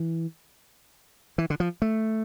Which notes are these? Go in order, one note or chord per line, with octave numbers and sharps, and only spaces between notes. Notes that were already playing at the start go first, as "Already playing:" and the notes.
Already playing: E3
E3
D3
F3
A3